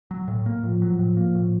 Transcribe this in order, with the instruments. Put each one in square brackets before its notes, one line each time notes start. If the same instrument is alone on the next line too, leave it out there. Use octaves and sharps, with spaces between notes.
[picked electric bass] F#3
A2
A#3
[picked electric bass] A2 [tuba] F3
[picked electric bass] F#3
A2
A#3
A2